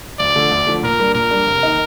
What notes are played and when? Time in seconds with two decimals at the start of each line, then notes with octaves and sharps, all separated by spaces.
0.19 D2 D5
0.36 D3 F3 A3
0.51 D2
0.67 D3 F3 A3
0.83 A#2 A#4
0.99 G3 A#3 D4
1.15 A#2 A#4
1.31 G3 A#3 D4
1.47 F1
1.63 D#3 A#3 D#4